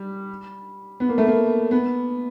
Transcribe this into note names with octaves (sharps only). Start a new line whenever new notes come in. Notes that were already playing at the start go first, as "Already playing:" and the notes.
Already playing: G3
B3
A#3
A3
A#3
B3